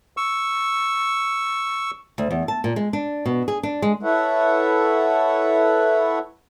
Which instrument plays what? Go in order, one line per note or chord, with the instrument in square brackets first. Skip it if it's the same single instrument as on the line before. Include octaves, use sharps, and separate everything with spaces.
[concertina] C#6 E6
[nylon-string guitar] D2
E2
A5
A#2
G#3
D4
B2
G#4
D4
G#3
[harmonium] E4 A4 B4 C#5 E5 F#5